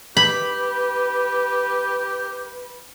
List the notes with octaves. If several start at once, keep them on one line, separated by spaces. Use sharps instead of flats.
G4 B4 B5